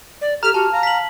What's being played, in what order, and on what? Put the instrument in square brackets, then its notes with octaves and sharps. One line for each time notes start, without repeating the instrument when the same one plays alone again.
[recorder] D5
[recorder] G4 [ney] A4 [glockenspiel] A#5 [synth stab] F6
[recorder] F#4 [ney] G4 [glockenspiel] A5
[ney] F5 [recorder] A#5
[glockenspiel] B6 F#7